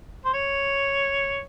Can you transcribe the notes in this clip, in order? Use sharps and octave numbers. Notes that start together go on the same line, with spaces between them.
C5
C#5